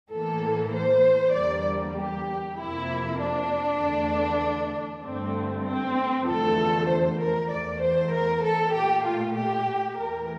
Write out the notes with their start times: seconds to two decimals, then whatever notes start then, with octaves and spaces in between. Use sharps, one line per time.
0.11 A2 E3 A#3 A4
0.73 C5
1.33 E2 D3 G3 A#3 D5
1.95 G4
2.57 F2 C3 F3 A#3 E4
3.20 D4
3.80 E2 D3 A3
5.04 G2 D3 A3 C4
5.65 C4
6.27 E2 D3 F3 A3 A4
6.88 C5
7.20 A#4
7.51 E2 E3 A3 D5
7.81 C5
8.13 A#4
8.44 A4
8.74 A#2 A3 G4
9.05 F4
9.35 G4
9.97 E2 E3 A3 A#4